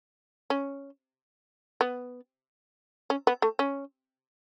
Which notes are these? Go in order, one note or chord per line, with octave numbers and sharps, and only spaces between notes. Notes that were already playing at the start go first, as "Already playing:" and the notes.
C#4
B3
C#4
B3
A3
C#4